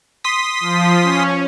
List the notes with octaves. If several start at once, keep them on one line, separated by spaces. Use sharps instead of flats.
C6 D#6 B6
F3
C#4